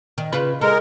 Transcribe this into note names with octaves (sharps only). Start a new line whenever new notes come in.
D#3
C#3 F4 B4
G#3 A4 A#4